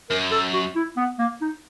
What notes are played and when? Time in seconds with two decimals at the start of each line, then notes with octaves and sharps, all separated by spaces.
0.10 F#2 A#4
0.31 A4
0.53 F#4
0.76 E4
0.97 B3
1.19 A#3
1.41 D#4